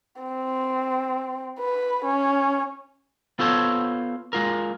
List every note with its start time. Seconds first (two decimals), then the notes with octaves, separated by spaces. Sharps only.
0.22 C4
1.60 B4
2.05 C#4
3.39 B3 F4 A4 C5 C#5
4.33 G#3 F4 A#4